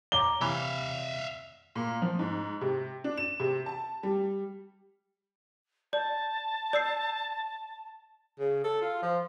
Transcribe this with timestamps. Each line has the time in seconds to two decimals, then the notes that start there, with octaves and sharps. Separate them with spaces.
0.12 C#5 A#5 D6 G7
0.42 C3 E3 E5 F5
1.75 A#2
2.02 F3
2.19 G#2
2.61 C3
3.04 D4
3.17 E7
3.40 C3
3.66 A5
4.03 G3
5.93 D5 A5
6.73 D5 E6 C7
8.39 C#3
8.64 A4
8.81 F4
9.02 F3